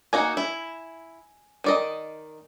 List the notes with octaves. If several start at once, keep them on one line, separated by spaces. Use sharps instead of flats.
A#3 D#4 F#4 G#5
E4
D#3 D5 D#5